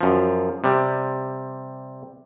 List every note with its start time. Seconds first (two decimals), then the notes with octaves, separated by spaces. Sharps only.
0.01 F#2 F3
0.64 C3 G3